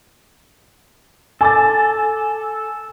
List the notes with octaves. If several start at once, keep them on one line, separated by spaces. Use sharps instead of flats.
A4 G#5 D6 A6